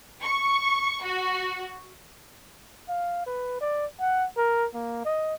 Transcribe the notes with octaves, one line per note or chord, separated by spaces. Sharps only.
C#6
F#4
F5
B4
D5
F#5
A#4
A#3
D#5